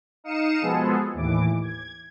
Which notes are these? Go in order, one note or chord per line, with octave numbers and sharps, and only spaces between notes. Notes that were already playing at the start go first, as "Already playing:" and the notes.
D#4 F5 D#6 C#7 E7
B2 F3 G#3 B3 G#4 A4
D#2 A2 E3 D6
G#6